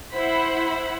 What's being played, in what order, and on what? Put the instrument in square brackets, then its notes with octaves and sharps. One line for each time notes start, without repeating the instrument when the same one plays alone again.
[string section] E4 C5 F#5 B5